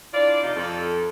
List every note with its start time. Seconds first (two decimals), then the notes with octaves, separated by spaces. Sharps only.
0.13 D4 E4 F4 D5
0.43 F2 C3 D#4 F4
0.55 F2 A4